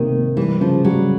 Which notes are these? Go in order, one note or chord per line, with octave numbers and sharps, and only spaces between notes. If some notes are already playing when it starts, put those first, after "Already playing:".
Already playing: C3 D#3 A#3
A#3
E3 G3
C#3 F3
F#3 G3